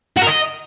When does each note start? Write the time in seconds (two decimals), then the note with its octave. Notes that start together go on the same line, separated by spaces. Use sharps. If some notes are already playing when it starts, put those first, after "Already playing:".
0.17 F#4
0.22 A#4
0.27 D#5